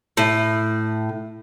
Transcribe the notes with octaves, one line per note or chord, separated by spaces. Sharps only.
A2